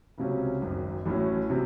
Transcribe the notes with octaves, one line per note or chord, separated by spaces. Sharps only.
C#2 C3 F#3 C#4
G#1 F#2 D#3
A1 A2 F#3 C#4
C3 F#3